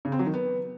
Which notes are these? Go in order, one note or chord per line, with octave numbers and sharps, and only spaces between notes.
C#3
C4
F#3
D#3
B3